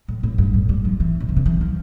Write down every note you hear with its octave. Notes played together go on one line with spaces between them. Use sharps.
A2
A2
G2
A2
G3
F3
E3
A#2
C3
D3
E3
F3